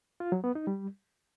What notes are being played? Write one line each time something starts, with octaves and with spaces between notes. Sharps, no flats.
F4
F#3
B3
D#4
G3